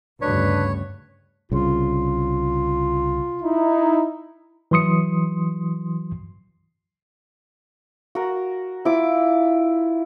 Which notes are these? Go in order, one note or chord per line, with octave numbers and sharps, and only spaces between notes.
D2 G2 C#3 D4 B4 C#5
C2 C#3 F4
D#4 E4
E3 F#3 C6 D#6 C#7
F#4 A#4
E4 F4 D6